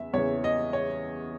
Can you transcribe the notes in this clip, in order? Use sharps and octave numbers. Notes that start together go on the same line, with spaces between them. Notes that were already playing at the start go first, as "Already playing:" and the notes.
Already playing: E2 C#3 E5
E2 C#3 E3 C#5
D#5
C#5